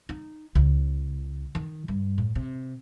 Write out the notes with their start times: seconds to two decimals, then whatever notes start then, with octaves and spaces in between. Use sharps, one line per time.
0.09 D#4
0.55 C#2
1.55 D#3
1.88 G2
2.18 A2
2.35 C3